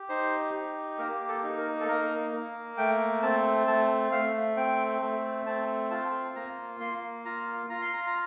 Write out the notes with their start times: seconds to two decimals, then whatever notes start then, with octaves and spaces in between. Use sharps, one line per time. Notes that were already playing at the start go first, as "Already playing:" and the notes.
Already playing: G4
0.09 D#4 C5
0.54 G4
0.99 A#3 A#4
1.28 A4
1.44 D#4
1.58 A#4
1.80 A4
1.88 A#3 A#4
2.33 A#3
2.77 A3 G5
3.22 C4 A5
3.67 A3 A5
4.12 A3 F5
4.57 C4 G5
5.01 A3
5.46 C4 A5
5.91 F4 A5
6.36 A#3 A#5
6.80 A#3 C6
7.25 F4 A#5
7.70 F4 A#5
7.82 C6
7.94 A#5
8.06 A#5